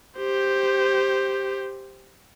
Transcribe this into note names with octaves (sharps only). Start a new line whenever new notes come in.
G4 C5